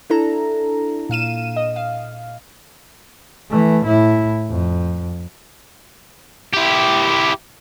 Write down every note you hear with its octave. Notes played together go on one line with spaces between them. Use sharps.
D4 E4 A4 A#5
A#2 F5 D#7 E7
D#5
F5
E3 A3
A2 E4
F2
E4 G4